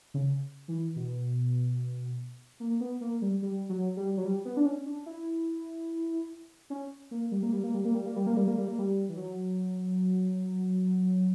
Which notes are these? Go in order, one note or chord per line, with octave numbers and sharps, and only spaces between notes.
C#3
E3
B2
A#3
B3
A#3
G3
G3
F#3
G3
F#3
G3
B3
D4
C#4
D4
E4
C#4
A#3
G3
A#3
G3
A#3
G3
A#3
G3
A#3
G3
A#3
G3
A#3
G3
A#3
G3
E3
F#3